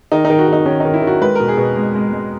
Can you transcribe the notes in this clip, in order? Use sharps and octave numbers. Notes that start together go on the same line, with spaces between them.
D#3 D#4
D#4
D#3
F#4
D#3 D#4
D#3 C#4
D#3 D#4
E4
D#3
F#4
G#3 B4
B2 A#4
G#4
B2
G#3
G#3
G#3